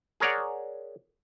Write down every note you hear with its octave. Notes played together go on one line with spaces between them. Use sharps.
G#4 A#4 C#5 D5 F#5